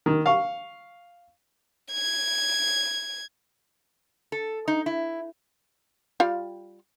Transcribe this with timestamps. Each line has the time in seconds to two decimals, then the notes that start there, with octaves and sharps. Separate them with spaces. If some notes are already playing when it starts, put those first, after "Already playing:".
0.06 D#3
0.26 F5 C#6
1.92 G#6
4.32 A4
4.68 D#4
4.86 E4
6.20 G3 F4 F5